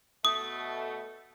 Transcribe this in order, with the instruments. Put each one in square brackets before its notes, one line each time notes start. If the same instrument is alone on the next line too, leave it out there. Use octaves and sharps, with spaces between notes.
[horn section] B2 A3 [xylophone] D#6